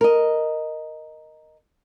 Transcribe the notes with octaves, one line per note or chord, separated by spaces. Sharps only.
A#4 D#5